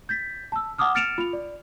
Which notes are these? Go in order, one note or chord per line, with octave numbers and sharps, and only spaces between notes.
G6 A6 B6
A5 E6
F#5 A5 D6 D#6 F6
F6 A6 C#7 D7 E7 F7
F4 F7
D5